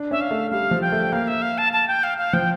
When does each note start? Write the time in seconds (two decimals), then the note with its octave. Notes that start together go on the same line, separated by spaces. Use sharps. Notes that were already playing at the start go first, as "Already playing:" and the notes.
Already playing: D4
0.11 C#4 E5
0.21 F5
0.31 A3
0.51 G3 F5
0.71 F3
0.81 G5
0.92 A3
1.12 A#3 F5
1.27 E5
1.42 F5
1.58 A5
1.73 A5
1.88 G5
2.04 F5
2.18 F5
2.33 F3 G5